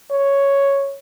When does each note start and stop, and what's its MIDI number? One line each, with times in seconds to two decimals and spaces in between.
0.11 0.98 73